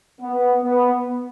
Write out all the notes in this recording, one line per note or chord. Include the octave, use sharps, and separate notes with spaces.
B3
B3